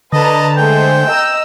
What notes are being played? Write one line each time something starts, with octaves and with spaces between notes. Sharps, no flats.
D3 B4 D#5 A5 A#5
G#3 A3 C5 G5
D#5 A#5 E6